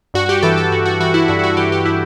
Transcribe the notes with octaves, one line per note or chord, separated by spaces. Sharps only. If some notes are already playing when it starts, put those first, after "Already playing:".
G2 F#4
G4
E3 A4
A4
G2 F#4
F#4
E3 F#4
E4
G2 F#4
E4
F#4
E3 G4
G4
E4